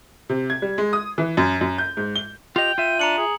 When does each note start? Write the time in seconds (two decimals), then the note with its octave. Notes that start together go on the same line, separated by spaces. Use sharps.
0.29 C3
0.50 G#6
0.62 G3
0.78 G#3
0.93 D#6
1.18 E3
1.37 F#2
1.61 F#2
1.78 G6
1.97 G#2
2.16 G7
2.56 F4 G4 D#5 G5 F7
2.78 F4 E5 D#7
2.99 D4 A#5 C#7 F#7
3.17 G#4